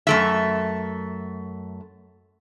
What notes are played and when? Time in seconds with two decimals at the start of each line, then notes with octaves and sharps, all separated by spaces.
0.07 F#2 A3 E5